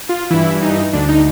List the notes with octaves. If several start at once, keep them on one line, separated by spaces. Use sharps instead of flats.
F4
G2 E3 E4
D#4
D2 D3 D4
D#4